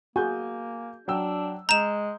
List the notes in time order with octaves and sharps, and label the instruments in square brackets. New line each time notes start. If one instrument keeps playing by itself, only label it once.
[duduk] A#3 [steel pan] F#4 G#4 [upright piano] G#5 G6
[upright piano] F#3 G5 E6 [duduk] D4
[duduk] G#3 [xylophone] A#5 E7 [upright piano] G6